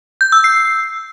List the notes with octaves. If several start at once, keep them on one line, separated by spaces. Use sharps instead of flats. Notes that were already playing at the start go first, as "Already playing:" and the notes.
G6
E6
C7